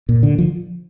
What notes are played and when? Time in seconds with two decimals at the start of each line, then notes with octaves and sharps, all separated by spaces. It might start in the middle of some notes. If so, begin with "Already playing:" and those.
0.09 A#2
0.23 D3
0.38 F3